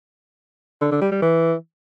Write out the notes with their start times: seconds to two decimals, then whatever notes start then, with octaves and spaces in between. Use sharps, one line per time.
0.81 D3
0.91 D3
1.02 G3
1.12 G3
1.22 E3